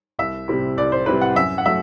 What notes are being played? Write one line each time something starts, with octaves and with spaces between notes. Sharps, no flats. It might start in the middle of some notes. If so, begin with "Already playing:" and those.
C2 E5
C3 G3 C4 E4
C2 D5
C5
C3 G3 C4 E4 B4
F#5
F#2 E5
F#5
F#3 A3 E5